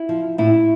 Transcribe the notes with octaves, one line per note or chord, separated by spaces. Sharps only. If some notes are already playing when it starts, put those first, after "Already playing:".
Already playing: E4
F3
A2 E4